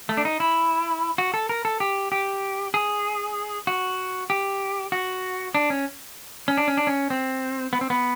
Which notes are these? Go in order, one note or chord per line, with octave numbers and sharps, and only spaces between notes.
A3
D4
D#4
E4
F#4
A4
A#4
A4
G4
G4
G#4
F#4
G4
F#4
D4
C#4
C#4
D4
C#4
D4
C#4
C4
B3
C4
B3